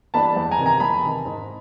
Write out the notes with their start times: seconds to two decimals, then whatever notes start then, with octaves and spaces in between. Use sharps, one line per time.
0.14 E3 G3 B3 D4 A5 B5
0.36 E2
0.51 G#5 A#5
0.58 C3 D#3
0.66 G#5 A#5
0.80 E2 A5 B5
1.03 C3 D#3
1.25 G#2